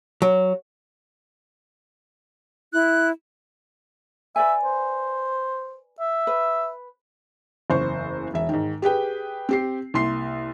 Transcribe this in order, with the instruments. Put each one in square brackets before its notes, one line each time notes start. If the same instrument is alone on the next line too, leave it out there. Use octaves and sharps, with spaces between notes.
[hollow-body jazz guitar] F#3
[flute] E4 [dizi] F#6
[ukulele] B4 D5 G#5 [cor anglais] E5
[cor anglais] C5
E5
[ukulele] B4
[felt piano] F#1 E2 C5 C#6
E1 E5
G#2 D#3
G4 G#4 B4 G5
C4 G4 C7
C2 A#3 C6 C7